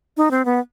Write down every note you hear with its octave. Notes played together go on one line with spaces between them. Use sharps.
D#4
C4
B3